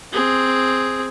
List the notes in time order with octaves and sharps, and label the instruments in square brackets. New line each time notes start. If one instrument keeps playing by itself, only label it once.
[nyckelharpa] C4 G#4